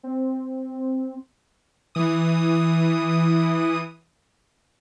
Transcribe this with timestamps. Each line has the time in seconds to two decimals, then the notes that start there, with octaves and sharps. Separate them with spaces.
0.03 C4
1.95 E3 D#6